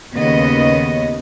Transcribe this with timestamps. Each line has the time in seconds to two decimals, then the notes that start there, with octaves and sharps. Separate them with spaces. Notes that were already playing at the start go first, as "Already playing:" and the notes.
0.15 D#2 C#3 B3 D#5